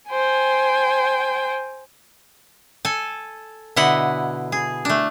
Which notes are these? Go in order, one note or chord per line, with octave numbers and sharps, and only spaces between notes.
C5 G5 G#5
A4 G#5
B2 D3 E4 D#5 F#5
G#4
A3 D4